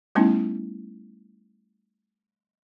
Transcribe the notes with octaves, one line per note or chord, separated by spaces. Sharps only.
G3 A3 B3 C#4 D#4 E4